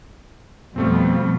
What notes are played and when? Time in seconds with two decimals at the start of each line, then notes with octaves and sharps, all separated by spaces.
0.76 F2 B2 F3 G3 A3 C4